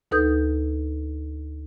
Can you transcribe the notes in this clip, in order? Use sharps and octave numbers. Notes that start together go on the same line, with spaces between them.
D2 D#4 A4 B4 D#6 G6